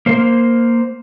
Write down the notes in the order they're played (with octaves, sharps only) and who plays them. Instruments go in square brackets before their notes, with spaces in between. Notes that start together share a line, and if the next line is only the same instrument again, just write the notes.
[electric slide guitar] A#3 C5